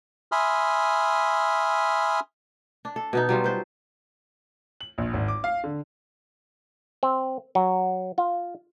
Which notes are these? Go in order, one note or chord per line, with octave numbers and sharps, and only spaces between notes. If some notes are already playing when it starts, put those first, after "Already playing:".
E5 G#5 B5 C6 D#6 F6
D4
A4
B2 B3 D#4
F#3 G3 F4
B4 C5
F#7
A#1
G#1
D6
F5
D3
C4
F#3
F4